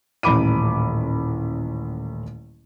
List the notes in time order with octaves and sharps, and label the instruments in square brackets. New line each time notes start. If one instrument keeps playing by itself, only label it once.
[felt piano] D#1 A1 B5 D6 D#7